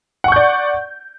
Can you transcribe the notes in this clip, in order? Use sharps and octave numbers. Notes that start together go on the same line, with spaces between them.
D5 F#5 C#6 G6